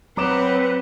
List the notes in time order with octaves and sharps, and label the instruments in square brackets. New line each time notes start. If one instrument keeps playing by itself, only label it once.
[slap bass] F#3 [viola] C4 F#5 [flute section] B4 [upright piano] A#5 D6 E7